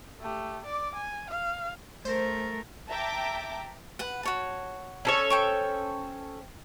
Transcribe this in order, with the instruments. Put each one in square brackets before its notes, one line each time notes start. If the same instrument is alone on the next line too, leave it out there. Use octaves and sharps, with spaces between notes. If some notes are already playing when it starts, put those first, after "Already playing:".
[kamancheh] A3 G4
D5 D6
G#5
F5
[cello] A3 A#4 [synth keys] C5
[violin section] E5 G5 A5 A#5 D6
[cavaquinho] B4 F#5
F#4 C#5 A5
[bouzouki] C#4 A4 C#5
[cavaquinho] C5 G5 C#6